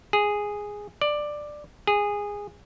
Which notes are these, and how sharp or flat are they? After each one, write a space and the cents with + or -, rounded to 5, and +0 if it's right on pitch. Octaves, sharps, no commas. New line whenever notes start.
G#4 -5
D5 +10
G#4 -15